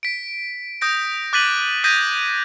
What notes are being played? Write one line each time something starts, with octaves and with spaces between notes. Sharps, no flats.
B6 D7
D#6 G6 A#6 D7
D6 F#6 A6 B6 D#7 F#7
D#6 G6 G#6 A#6 B6 D#7